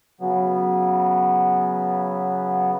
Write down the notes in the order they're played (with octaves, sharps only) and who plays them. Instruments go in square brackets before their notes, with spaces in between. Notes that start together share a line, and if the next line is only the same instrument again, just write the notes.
[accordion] C#3 F#3 B3